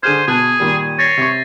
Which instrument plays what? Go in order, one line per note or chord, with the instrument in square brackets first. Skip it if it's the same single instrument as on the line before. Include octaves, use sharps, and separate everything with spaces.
[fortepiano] D3 G#4 F6 [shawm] C5 [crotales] G#6 D#7
[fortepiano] B2 A5 F#6 [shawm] G#4
[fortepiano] A#2 D#3 G3
[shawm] C#5 [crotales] A6 A#6 C7
[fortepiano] C3 C#6